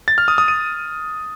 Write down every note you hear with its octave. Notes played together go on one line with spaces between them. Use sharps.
A6
F6
D#6
D#6
D#7